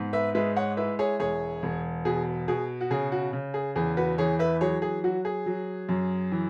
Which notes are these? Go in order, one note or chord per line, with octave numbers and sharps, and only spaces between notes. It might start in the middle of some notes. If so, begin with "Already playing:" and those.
Already playing: G#2 B3
B4 E5
G#3 B4 E5
C#5 F#5
E4 B4 E5
G#4 C#5
E1 G#4 C#5
E1
B2 G#4
B2 G#4
F#4
C#3 G#4
F#4
C#3
G#4
E2 G#4
F#4 B4
E3 G#4 C#5
B4 E5
F#3 G#4 C#5
G#4
F#3 F#4
G#4
F#3
F#2
E3